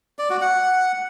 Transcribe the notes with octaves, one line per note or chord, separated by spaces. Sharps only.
D5
F#4
F#5